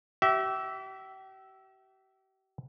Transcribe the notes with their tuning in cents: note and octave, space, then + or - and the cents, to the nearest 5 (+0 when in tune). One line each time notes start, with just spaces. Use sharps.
G4 -40 E5 +0